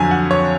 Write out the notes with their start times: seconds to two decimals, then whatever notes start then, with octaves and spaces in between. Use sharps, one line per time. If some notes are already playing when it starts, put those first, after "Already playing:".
Already playing: F2 D3 F#3 G#5
0.11 F#5
0.31 C#5